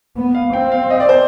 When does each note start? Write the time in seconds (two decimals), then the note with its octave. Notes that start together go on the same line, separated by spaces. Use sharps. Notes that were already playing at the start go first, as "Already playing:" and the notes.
0.17 B3
0.35 F5
0.53 C4 G5
0.72 F5
0.90 D#5
1.00 D5
1.09 C5